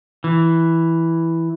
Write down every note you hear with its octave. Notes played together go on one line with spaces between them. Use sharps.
E3